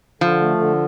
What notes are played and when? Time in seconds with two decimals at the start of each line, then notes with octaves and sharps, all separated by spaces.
0.21 D3 F3
0.41 A3
0.59 D3